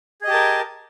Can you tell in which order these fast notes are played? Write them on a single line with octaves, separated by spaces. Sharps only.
G#4 D#5 G4 A5 A#4